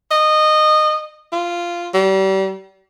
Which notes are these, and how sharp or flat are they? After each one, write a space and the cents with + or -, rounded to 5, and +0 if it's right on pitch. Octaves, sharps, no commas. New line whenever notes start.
D#5 -20
F4 -10
G3 -35